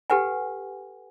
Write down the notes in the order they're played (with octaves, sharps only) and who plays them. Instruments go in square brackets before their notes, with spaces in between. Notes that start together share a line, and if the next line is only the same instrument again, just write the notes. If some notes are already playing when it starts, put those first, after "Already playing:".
[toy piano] G4 A4 B4 F#5 G#5